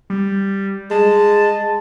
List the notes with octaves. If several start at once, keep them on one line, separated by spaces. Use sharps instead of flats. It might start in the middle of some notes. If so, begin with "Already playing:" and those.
G3
G#3 A5